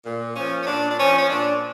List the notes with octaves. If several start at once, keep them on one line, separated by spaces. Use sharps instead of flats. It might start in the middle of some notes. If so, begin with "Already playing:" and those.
A#2
F3 C#4
C#4
A#2 D4
D4
F3 C#4
C#4
A#2 D4